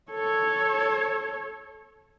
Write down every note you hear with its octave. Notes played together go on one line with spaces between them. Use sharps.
A4 C#5